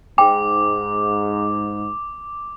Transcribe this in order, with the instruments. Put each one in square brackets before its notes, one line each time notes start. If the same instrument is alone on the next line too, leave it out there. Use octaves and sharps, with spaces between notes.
[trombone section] G#2 [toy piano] G5 [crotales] D6